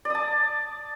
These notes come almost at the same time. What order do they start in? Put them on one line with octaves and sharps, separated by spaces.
D5 D#6 A5